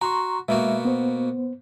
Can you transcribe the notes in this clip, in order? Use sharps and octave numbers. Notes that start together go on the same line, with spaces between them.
F#4 A#5 C6 C#6
B2 G#3 A#3 F#4 E5
B3 C5